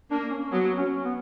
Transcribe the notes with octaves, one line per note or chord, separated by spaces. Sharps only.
A#3 D4
C#4
F#3 B3
C#4
B3